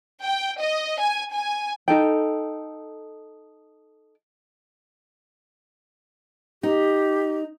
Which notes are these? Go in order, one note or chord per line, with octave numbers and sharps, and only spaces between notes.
G5
D#5
G#5
G#5
D#4 A4 G5
D#4 G4